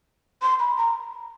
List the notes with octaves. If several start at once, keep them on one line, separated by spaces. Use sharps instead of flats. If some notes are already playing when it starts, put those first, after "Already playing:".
C6
B5
A#5